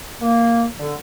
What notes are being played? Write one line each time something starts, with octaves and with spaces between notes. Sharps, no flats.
A#3
D3